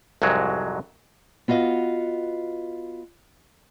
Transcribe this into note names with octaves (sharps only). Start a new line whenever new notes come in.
C2 F2 G#2 F#3 G#3
B3 F4 F#4 D#5 F5